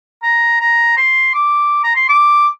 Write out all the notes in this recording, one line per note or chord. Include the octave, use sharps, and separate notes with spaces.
A#5
A#5
C6
D6
A#5
C6
D6